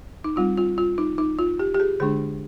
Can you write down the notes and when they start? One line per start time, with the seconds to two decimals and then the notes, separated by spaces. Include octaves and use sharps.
0.24 D#4
0.36 G3 C4 D#4 F4
0.58 F4
0.78 F4
0.98 D#4
1.18 D#4
1.39 F4
1.59 G4
1.74 G4
1.80 G#4
2.00 D3 G#3 D4 G#4